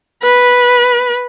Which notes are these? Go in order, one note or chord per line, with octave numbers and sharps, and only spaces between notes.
B4